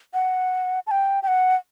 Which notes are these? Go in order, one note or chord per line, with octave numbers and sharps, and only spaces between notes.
F#5
A5
G5
G5
F#5